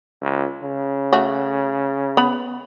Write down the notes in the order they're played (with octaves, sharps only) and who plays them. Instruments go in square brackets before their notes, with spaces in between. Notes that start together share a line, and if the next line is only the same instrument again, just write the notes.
[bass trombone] C#2
C#3
[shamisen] A3 F#4
B3 B5